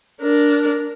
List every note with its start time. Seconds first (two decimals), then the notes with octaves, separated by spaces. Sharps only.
0.22 D4 A#4